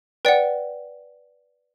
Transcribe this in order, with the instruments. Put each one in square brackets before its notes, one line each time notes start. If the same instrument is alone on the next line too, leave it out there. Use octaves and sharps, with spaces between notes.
[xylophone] B4 D5 F#5 G5